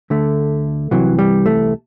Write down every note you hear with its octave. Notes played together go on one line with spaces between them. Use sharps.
D2 D3 A3
C2 C3 E3 F#3
G3
A3